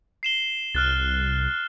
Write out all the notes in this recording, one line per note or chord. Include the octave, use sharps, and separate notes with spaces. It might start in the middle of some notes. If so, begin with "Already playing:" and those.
C7 E7 G7
C2 F6 F#6 A6